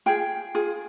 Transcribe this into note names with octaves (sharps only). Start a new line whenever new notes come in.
F4 G#4 G5
F4 G#4